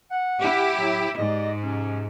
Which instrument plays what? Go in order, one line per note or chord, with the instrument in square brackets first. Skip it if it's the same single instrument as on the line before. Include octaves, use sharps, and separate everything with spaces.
[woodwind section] F#5
[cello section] E4 G4
[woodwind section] A2 F#3
[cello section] G#2 [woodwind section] G4 D5 D#5
[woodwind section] C3 F3 C#4